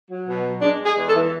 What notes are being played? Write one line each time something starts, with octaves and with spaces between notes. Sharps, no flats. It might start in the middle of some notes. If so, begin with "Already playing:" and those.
F#3
B2
F#3
G#3 D4
G#3
G#4
E2
A4
E3